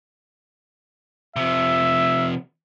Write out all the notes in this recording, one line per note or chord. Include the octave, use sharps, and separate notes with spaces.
C3 F3 E5